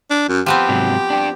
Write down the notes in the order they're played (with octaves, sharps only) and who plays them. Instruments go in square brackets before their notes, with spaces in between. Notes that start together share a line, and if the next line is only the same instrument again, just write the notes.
[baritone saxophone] D4
F#2
[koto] F3 B3 C4 [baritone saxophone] G4
[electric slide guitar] G#2 C3 F#3
D4 G5